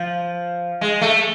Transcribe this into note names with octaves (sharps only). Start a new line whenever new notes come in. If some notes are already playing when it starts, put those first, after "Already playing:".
Already playing: F3
G#3
A3